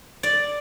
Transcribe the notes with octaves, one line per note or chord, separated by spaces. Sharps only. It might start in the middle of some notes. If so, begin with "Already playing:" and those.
D5